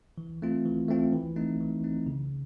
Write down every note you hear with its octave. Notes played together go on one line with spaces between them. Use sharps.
E3
A3 C4 F4
E3
A3 C4 F4
E3
A3 C4 D#4
E3
A3 C4 D#4
C#3